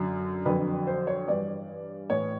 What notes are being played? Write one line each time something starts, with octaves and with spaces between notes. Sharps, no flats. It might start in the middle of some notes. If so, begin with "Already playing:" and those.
Already playing: F#2 D3 F#3
F2 D3 F#3 B4
C5
C#5
G2 E3 D5
A2 E3 C#5